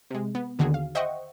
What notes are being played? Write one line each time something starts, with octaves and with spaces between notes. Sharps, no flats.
C3 G#3
B3
D#2 D3 D#3 F#4 G#4
F5
C5 D#5 E5 F#5 G5 C#6